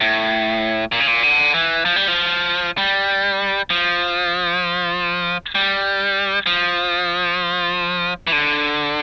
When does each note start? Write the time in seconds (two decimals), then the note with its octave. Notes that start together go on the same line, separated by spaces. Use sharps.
0.01 A2
0.92 A#2
1.00 C#3
1.07 A#2
1.23 D3
1.54 E3
1.85 F3
1.96 G3
2.08 F3
2.78 G3
3.70 F3
5.55 G3
6.46 F3
8.27 E3
8.32 D3